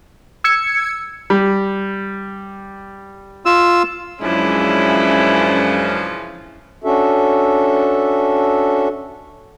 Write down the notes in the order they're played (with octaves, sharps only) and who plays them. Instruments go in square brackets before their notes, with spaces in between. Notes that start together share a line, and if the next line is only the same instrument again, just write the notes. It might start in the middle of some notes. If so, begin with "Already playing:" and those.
[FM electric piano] E6 G#6 C#7
[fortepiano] G3
[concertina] F4 E6
[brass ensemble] F#2 G#3 D4 [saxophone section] C#3 E3 F3 [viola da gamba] C#4 E4
[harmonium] C#4 D4 F#4 A4 E5